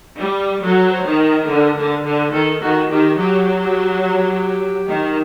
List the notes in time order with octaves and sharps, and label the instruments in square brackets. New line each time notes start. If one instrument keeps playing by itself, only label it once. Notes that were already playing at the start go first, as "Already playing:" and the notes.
[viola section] G3
[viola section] F#3 [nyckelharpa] A4
[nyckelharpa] C5
[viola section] D#3
[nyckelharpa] A#4
[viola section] D3
D3
D3
[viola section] D#3 [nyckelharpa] A4
[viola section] D#3 [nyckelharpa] F#4
[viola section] D#3 [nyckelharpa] G4
[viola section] F#3 [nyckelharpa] G4
[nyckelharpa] G4
G4
[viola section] D#3